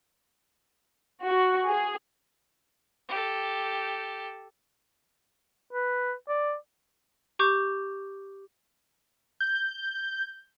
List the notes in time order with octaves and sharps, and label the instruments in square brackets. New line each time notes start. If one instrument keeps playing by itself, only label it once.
[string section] F#4
G#4
[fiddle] G4 A4
[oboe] B4
D5
[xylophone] G4 C#6 D6 G6
[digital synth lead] G6